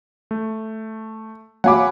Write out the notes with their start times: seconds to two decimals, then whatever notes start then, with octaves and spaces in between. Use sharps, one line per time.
0.31 A3
1.64 F#3 F5 F#5 G#5 B5 D6